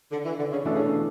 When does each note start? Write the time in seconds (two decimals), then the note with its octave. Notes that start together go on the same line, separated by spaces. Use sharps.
0.11 D3
0.25 E3
0.39 D3
0.52 C#3
0.65 B2 E3 A3 D4 A4
0.74 C#3
0.83 B2